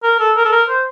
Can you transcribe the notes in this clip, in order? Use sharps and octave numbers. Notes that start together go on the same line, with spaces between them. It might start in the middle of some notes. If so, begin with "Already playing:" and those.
A#4
A4
A#4
A4
A#4
C5